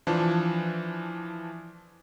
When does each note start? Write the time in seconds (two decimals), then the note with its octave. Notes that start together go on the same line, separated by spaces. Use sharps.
0.07 E3 F3 D4